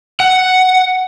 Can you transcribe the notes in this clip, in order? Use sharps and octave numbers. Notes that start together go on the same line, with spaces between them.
F#5